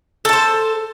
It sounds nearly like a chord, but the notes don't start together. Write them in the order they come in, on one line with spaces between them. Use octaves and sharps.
A4 A5 C5